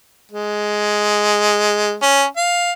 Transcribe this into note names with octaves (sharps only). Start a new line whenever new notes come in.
G#3
C#4
F5